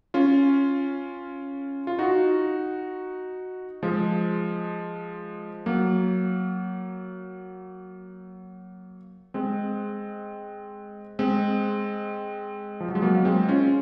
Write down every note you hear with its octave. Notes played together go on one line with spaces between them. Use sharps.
C#4 F4
F4
D#4 F#4
F3 G#3
F#3 A#3
G#3 C4
G#3 C4
F3
F#3
G#3
F#3 A#3
A#3
G#3 C4
C#4 F4